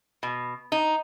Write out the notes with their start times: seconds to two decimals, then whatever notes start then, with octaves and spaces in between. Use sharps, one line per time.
0.23 B2
0.72 D#4